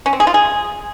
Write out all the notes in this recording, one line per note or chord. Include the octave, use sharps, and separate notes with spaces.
C#4
C4
G#4
F4
G#4